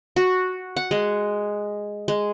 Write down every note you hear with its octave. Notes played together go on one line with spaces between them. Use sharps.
F#4
F#5
G#3
G#3